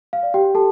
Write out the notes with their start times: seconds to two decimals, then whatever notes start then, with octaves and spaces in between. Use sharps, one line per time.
0.13 F5
0.23 D5
0.34 G4 G5
0.55 G4 A4 A5